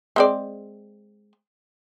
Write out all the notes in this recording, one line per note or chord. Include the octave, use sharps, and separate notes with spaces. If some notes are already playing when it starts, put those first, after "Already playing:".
G#3 C4 D5